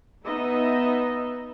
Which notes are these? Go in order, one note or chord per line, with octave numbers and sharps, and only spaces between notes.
B3 D#4 D#5 E5